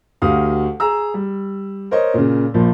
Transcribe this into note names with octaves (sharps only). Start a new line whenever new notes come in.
D2 F#4 G4 F5 D#6
G#4 A#5 E6
G3
A#4 C5 C#5 D#5
A#2 C#3
A#1 A#2 F3